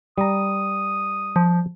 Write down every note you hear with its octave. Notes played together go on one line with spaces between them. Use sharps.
G3 A#5 D#6
F3